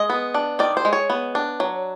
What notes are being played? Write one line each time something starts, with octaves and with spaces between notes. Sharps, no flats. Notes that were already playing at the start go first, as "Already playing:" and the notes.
Already playing: G#3 D#5
B3
D4
D#3 D5
C5
G#3
C#5
B3
D4
F#3